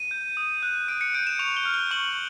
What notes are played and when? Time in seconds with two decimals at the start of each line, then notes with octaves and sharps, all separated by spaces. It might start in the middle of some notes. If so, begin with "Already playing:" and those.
Already playing: D#7
0.11 G6
0.37 D#6
0.63 F#6
0.88 D#6 D7
1.01 C#7
1.15 G6 D7
1.27 E7
1.39 C#6 F7
1.57 G7
1.66 F6
1.74 G7
1.91 C#6 F#7